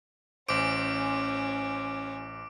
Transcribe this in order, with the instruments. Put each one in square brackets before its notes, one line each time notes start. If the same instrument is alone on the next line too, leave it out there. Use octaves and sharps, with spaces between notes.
[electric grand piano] A1 C5 [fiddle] C#4 G#5 [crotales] D6 D7